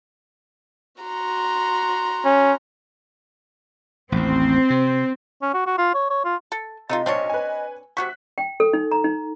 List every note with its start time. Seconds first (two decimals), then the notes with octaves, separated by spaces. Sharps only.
1.02 F#4 A#5 C6
2.25 C#4
4.12 A1 D#2 C4
4.70 C3
5.42 C#4
5.54 F#4
5.66 F#4
5.78 F4
5.94 C#5
6.10 C#5
6.25 F4
6.52 A4
6.89 C3 A3 D#4 F4 D#5
7.06 B1 C4 D4 C#5
7.29 B4 G#5
7.97 C3 F#4 C#6 F#6 B6
8.38 G5
8.60 A4
8.73 D#4
8.91 A#5
9.04 D#4